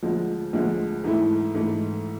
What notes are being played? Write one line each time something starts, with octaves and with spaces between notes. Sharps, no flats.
D2 D3 F3 G#3
D2 D3 F3 G#3
G#2 E3 A3 E4
G#2 E3 A3 E4